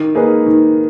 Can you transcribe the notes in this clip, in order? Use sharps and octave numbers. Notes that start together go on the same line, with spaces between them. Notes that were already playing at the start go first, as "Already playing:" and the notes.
Already playing: D#3
A#3 D#4 G#4 B4
D#3